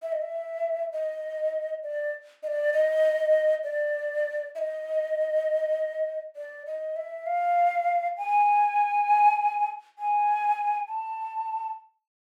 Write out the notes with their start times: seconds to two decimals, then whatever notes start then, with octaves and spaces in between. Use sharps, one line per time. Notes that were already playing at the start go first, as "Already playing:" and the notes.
0.02 E5
0.12 D#5
0.22 E5
0.93 D#5
1.83 D5
2.43 D#5
2.47 D5
2.74 D#5
3.64 D5
4.55 E5
4.58 D#5
6.36 D5
6.66 D#5
6.96 E5
7.26 F5
8.17 G#5
9.99 G#5
10.88 A5